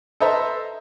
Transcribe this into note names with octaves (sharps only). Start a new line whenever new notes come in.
A4 B4 C5 D#5 E5 A#5